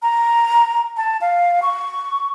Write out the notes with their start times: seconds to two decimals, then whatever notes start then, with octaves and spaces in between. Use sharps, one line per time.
0.02 A#5
0.97 A5
1.21 F5
1.62 C#6